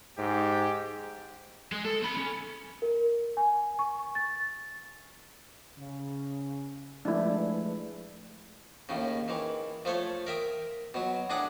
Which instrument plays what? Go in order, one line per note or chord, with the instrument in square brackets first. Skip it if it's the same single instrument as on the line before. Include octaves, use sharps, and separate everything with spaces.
[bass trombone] G#2 [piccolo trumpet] G4
[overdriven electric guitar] G#3 G#4
A4
C4 B5
C#4
[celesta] A#4
G#5
C#6
A6
[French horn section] C#3
[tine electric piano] F3 G#3 A3 [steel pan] D4 E4 [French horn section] G#4 B4 D5
[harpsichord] D#2 A2 C#3
D#3 E3
F3 A3 A4 C#5
A#4 E5 G5 D#6
B2 F#3
A2 D4 G#4 F#5 D#6